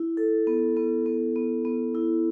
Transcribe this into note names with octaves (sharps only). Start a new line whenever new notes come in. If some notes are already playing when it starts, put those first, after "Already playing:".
Already playing: E4
A4
B3
B3
B3
B3
B3
E4